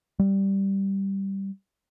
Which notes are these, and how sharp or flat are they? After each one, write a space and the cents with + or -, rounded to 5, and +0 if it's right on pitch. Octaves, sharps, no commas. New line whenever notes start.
G3 -5